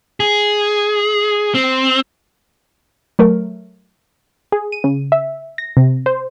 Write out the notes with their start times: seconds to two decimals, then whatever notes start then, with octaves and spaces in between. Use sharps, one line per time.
0.20 G#4
1.55 C4
3.19 F#3 A3 A#4
4.52 G#4
4.72 D#7
4.84 C#3
5.12 E5
5.58 A#6
5.77 C3
6.06 C5